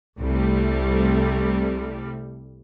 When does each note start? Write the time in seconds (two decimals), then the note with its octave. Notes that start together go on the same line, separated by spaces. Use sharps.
0.21 C2 C3 G3 A3